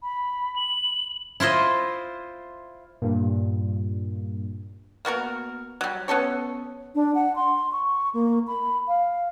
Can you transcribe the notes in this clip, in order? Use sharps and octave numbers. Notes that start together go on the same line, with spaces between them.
B5
F#7
E4 F4 C5 D#5
G2 A#2
A#3 B3 F#4 A#4
F#3 G3
B3 C#4 A4 C#5
D4
F#5
C6
C#6
A#3
B5
F5